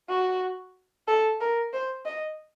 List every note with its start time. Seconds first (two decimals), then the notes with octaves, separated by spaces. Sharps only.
0.09 F#4
1.08 A4
1.40 A#4
1.73 C5
2.05 D#5